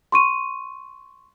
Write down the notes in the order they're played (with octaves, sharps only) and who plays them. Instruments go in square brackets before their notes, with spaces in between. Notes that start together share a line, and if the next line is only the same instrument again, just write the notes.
[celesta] C6 C#6 D#7